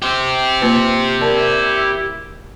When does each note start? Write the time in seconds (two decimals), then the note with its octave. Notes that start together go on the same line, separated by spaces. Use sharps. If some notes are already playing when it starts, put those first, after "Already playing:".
0.02 G4 C5
0.61 A#3 C4 F4 B4
1.21 E4 A#4 D5 A5